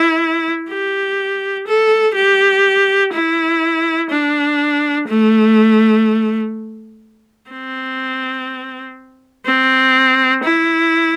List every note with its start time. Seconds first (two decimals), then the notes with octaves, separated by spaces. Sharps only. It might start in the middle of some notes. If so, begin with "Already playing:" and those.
Already playing: E4
0.70 G4
1.67 A4
2.15 G4
3.13 E4
4.10 D4
5.07 A3
7.51 C4
9.46 C4
10.44 E4